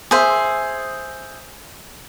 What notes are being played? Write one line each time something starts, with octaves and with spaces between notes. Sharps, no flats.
G#4 C5 E5